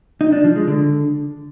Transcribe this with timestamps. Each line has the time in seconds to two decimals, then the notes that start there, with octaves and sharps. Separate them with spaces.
0.21 D#4
0.32 D4
0.44 F3
0.56 G#3
0.68 D3